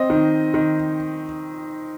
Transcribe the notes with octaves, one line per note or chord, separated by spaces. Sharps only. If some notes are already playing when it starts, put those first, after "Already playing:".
Already playing: C4 D#5
D#3
D#3